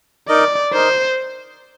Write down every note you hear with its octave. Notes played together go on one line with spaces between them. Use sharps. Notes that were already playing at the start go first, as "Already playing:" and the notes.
D#4 A#4 D5 D#5
D#4 A#4 C5 D#5